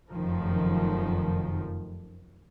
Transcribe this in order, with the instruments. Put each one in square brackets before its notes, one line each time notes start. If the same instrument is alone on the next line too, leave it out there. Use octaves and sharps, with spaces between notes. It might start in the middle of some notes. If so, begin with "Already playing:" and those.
[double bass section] F1 F#2 D#3 F3